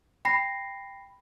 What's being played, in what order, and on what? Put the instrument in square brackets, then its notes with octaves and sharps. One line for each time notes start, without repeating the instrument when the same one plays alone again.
[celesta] G5 B5 A#6 C7